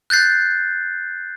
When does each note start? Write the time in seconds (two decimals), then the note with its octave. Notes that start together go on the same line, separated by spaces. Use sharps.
0.10 F#6 G6 A6 C7